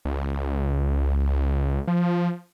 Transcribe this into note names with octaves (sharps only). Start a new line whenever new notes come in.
C#2
F3